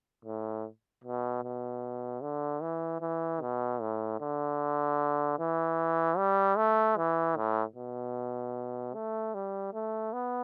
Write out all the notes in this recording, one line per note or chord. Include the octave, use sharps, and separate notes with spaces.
A2
B2
B2
D3
E3
E3
B2
A2
D3
E3
G3
A3
E3
A2
B2
A3
G3
A3
B3